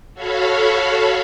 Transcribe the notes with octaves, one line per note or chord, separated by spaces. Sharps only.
F#4 A4 C#5 F5 B5